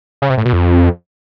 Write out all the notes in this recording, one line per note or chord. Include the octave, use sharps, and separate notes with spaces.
C#3
C3
A2
B2
F2